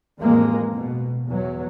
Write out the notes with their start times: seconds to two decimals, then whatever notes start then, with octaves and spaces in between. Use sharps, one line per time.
0.19 A1 F2 G#3 A#3
0.73 B2
1.28 E2 F#3